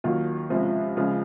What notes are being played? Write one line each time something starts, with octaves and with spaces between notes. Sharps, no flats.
D#2 D#3 F#3 F4
C#2 C3 F3 F4
C#2 C#3 F3 F4